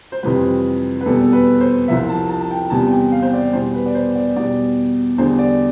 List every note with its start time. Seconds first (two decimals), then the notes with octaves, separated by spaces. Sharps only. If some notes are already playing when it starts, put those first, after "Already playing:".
0.12 C5
0.23 F2 C3 E3 G3 B4
1.01 B4
1.06 E2 B2 G3 A4
1.26 A4
1.33 B4
1.60 C5
1.88 C2 C3 F3 E5
2.09 A5
2.29 A5
2.41 A5
2.51 G5
2.70 E2 C3 E3 G3 A5
2.91 G5
3.12 F5
3.22 C5
3.33 D5
3.53 E2 B2 G3 C5
3.74 B4
3.86 D5
3.95 C5
4.15 D5
4.36 E2 B2 G3 D5
5.18 E2 D3 G3 C5
5.38 D5